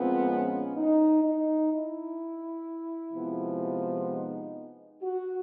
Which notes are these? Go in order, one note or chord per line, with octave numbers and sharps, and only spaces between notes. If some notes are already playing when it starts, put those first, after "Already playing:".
Already playing: A#2 F3 G#3 B3 C4
C#4
D#4
D#4
E4
C3 F3 G#3 B3
D#4
F#4